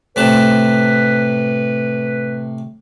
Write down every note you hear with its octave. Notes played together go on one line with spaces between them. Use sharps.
A2 C3 B4 A5